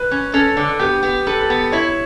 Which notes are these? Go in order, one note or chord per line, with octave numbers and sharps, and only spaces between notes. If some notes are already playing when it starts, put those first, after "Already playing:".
Already playing: B4
C#4
C#4 A4
D3
B3 G4
B3
A4 B4
A4
B3
E4 C#5